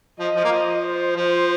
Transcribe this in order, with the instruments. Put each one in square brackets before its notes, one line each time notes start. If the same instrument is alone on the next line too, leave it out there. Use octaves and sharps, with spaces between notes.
[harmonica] F3 [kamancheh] D#5
[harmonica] F3
A#3
F3
[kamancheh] C5
[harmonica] F3